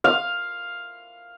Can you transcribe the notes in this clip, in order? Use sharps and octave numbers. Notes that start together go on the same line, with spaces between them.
F5